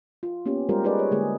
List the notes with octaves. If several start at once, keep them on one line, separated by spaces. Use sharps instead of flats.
F4
A#3 B3 C#4 G4
G3 G#3 F4 G4 A#4 C5
D#4 G#4 A#4 B4 D5
C#5
D3 G#3 A#3 G#4